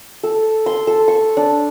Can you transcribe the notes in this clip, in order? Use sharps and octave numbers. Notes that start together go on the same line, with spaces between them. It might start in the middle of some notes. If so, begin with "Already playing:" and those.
A4
C6
A4
C#6
D4